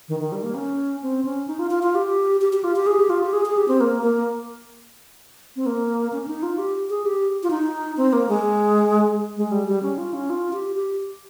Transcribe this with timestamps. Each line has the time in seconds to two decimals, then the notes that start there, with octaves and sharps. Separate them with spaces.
0.09 D#3
0.20 D#3
0.32 G3
0.43 A#3
0.55 C#4
1.02 C4
1.25 C#4
1.47 D#4
1.59 F4
1.71 F4
1.83 F4
1.95 G4
2.41 G4
2.53 G4
2.64 F4
2.76 G4
2.87 G#4
2.99 G4
3.10 F4
3.23 G4
3.33 G#4
3.46 G#4
3.57 G4
3.68 C4
3.81 A#3
4.03 A#3
5.56 C4
5.66 A#3
6.12 C#4
6.23 C#4
6.28 D#4
6.43 F4
6.58 G4
6.90 G#4
7.05 G4
7.43 F4
7.50 D#4
7.97 C4
8.13 A#3
8.29 G#3
9.37 G#3
9.52 G3
9.68 G3
9.82 C#4
9.98 F4
10.14 C#4
10.30 F4
10.53 G4
10.75 G4